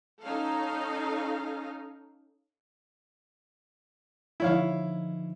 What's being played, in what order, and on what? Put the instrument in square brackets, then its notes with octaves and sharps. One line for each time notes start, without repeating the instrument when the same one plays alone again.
[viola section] C#4 D#4 A4 F5
[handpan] D3 F3 D#4 [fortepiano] E4 C#5 F5